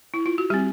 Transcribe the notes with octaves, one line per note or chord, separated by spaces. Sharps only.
E4
F4
F#4
G3 C4 G4